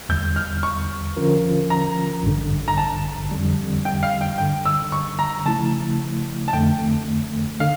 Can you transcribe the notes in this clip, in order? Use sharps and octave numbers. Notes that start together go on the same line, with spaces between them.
E2 D3 G3 G6
F6
C#6
D3 F3 C#4 F4 A#4
A#5
A1 G2 D3
A#5
A5
F2 D3 G3
G5
F5
G5
G2 D3 G3 G5
E6
C#6
A#5
C#3 F3 A3 E4 A5
A5
F2 D3 A3 G5
D3 F5